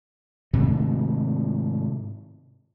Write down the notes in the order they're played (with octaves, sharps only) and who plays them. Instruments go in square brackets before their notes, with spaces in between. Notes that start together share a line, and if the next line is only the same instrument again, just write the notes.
[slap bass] G#2 C3 D#3 A3